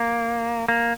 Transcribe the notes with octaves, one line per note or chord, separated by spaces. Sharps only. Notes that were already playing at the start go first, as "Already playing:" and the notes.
Already playing: A#3
A#3